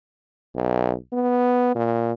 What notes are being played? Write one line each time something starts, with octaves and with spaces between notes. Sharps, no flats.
B1
B3
A#2